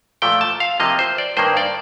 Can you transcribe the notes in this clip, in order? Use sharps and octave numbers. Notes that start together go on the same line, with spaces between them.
A#2 F3 A3 G5
A5
F5
C3 F3 A#3 D#5
C5
D5
G2 D#3 A#3 C5
D5